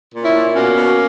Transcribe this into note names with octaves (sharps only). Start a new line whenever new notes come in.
A#2
C#4 E4
A#2
B2 A#3 C#4
B2